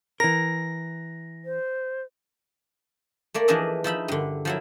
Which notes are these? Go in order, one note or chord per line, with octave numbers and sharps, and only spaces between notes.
E3 A#4 A#6
C5
A3 A#3 D5
E3 F3 D4 G#4 D#5 E5
F3 D#4 E5 B5
G2 D3
F3 F#3 E4